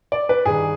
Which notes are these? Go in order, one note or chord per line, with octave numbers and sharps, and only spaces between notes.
D5
B4
G2 D#3 G#4